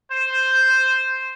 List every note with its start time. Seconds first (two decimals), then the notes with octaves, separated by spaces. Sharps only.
0.12 C5